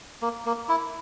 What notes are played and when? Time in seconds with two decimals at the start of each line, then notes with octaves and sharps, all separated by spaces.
0.22 A#3
0.46 A#3
0.69 E4